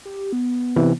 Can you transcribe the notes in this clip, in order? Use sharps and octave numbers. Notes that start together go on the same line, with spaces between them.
G4
B3
C3 E3